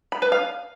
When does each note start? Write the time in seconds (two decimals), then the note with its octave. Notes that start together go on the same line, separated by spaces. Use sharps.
0.12 B5
0.22 B4
0.32 F5